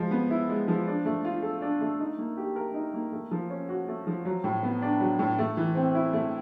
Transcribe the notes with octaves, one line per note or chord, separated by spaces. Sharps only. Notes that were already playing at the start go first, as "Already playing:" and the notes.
Already playing: F3 G#3
B3
E4
G#3
F3
D4
A3
F4
A4
D4
A3
D#4
A#3
G4
A#4
D#4
A#3
A3
F3
C#4
F#4
A3
F3
F#3
A2
B3
D4
F#3
A2
A3
E3
C4
E4
A3